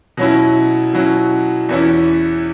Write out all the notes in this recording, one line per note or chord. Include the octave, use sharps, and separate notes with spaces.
B2 F#3 C#4 E4
B2 F#3 C#4 E4
E2 E3 C#4 E4